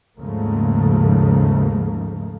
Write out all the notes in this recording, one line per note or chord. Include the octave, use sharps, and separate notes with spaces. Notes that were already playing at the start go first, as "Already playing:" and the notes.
D#2 G#2 C#3 F3 A3 A#3